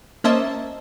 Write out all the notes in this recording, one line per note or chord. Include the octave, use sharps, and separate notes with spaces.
A#3 C#4 C5 D#5 E5 A5